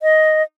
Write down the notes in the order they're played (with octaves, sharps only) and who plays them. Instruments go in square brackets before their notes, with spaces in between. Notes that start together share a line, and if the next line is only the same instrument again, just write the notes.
[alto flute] D#5